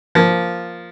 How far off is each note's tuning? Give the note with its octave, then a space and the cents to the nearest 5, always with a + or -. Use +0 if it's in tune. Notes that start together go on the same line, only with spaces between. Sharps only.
F3 +0 A#3 +0